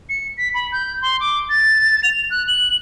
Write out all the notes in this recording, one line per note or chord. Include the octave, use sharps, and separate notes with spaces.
C#7
B6
B5
G6
C6
D6
A6
F7
F#6
F#7